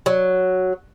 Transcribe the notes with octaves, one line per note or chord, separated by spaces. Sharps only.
F#3